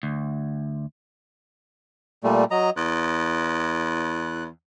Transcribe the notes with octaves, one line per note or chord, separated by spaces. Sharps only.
D2
A#2 G3 A3
F#3 D#5 A#5
E2 F#6